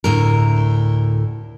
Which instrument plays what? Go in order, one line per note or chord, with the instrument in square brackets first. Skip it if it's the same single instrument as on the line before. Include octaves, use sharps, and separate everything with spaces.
[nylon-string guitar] D2 A2 A#4